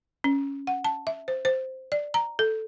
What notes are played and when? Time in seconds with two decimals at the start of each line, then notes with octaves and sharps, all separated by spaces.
0.24 C#4
0.67 F#5
0.85 A5
1.07 E5
1.28 C5
1.45 C5
1.92 D5
2.14 A#5
2.39 A4